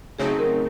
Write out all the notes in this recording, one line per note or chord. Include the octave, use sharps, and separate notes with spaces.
C#3 F#3 A3 C4 D#4 G#4
A#4